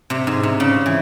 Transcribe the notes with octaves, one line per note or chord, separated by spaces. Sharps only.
C3
G#2
C3
C#3
E3